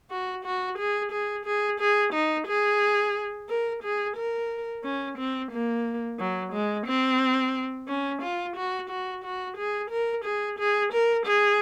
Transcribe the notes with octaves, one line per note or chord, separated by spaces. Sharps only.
F#4
F#4
G#4
G#4
G#4
G#4
D#4
G#4
A#4
G#4
A#4
C#4
C4
A#3
F#3
G#3
C4
C#4
F4
F#4
F#4
F#4
G#4
A#4
G#4
G#4
A#4
G#4